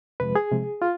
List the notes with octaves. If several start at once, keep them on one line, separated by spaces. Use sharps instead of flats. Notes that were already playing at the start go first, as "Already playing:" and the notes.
F2 C3 F3 G#3 B4
G#4
C3 F3 G#3
F4